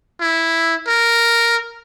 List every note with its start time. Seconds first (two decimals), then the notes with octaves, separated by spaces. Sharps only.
0.21 E4
0.87 A#4